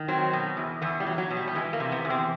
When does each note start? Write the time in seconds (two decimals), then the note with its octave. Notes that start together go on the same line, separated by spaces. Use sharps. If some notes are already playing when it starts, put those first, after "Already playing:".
Already playing: D#3
0.08 F#3 C4
0.33 B2
0.57 E2
0.82 E2 B3
1.00 G3
1.07 F#3
1.18 F#3
1.31 B2
1.36 G3
1.48 G3
1.55 E3 G#3
1.73 A#3
1.80 C3
1.92 B3
2.05 E2
2.10 C4